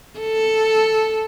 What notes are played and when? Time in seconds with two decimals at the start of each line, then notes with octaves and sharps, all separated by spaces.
0.19 A4